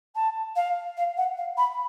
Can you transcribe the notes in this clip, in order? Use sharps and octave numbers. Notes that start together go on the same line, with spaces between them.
A5
F5
F5
F#5
F5
B5